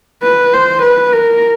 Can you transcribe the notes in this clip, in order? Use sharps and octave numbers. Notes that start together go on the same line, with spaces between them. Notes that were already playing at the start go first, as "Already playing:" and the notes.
B4
C5
B4
A#4